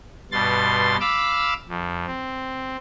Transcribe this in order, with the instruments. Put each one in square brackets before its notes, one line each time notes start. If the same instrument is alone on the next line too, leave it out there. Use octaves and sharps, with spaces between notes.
[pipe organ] G2 B2 C6 A6
F5 B5 D6 E6
F2
C4